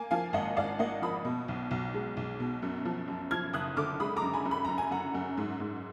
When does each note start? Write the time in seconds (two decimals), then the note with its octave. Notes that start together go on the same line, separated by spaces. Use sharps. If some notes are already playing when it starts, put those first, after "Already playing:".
Already playing: A#3 G#5
0.11 F3 F5 G#5
0.33 G#1 D#5 F#5
0.57 G#1 D5 F5
0.79 A#3 D#5 F#5
1.02 F3 B5 D#6
1.25 B2
1.48 B1
1.71 B1
1.94 G#3
2.17 B1
2.40 B2
2.62 F#2
2.85 F3
3.08 F#2
3.31 F3 F6 G#6
3.53 F#1 D#6 F#6
3.77 D3 D6 F6
4.00 G#3 B5 D#6
4.16 A#5 D6
4.22 F#2
4.33 G#5 B5
4.45 F#2
4.51 B5
4.65 F#2 A#5
4.78 G#5
4.91 F#2 F#5 A#5
5.15 F#2
5.38 G#2
5.60 G#2